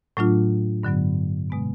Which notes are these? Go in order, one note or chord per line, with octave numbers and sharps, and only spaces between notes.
A2 F#3 A3 D4 F4
G2 D3 F#3 B3
B2 G#3 B3